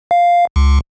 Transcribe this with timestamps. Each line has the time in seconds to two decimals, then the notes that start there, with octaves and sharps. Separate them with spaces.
0.11 F5
0.56 C#2